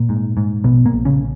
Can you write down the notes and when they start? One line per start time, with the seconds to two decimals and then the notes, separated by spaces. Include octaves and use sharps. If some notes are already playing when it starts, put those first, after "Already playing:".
Already playing: A#2 A#3
0.09 G#2
0.37 G#2
0.64 A#1 B2 B3
0.85 A#2 A#3
0.92 A#1
1.05 C#3 C#4